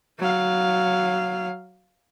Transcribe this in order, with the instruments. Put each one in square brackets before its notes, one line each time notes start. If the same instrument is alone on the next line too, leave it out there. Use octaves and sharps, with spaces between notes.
[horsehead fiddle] F#3 F5